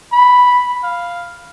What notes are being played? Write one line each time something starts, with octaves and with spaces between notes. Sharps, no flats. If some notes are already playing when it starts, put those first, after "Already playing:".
B5
F5